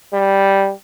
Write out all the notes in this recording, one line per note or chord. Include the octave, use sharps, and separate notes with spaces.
G3